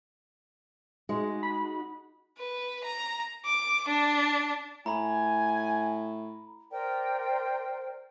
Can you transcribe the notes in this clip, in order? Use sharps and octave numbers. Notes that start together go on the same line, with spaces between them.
G#3 D#4 F#4
B5
B4
A#5
D6
D4
A2 G#5 A#5 B5
A#4 C5 D5 G5